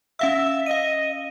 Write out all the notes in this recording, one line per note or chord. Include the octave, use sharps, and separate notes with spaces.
C#4 E5 F5 E6
D#5 F5 D#7